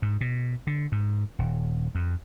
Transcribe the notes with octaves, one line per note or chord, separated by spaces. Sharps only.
G#2
B2
D3
G#2
D#1
F2